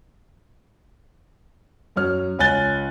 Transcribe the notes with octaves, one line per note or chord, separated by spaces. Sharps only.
F#2 F#3 C#5 F6
C#2 C#4 G#5 F#6 A6 G7